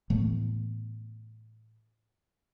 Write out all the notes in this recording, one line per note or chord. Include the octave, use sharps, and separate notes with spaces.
A2 E3 A3 B3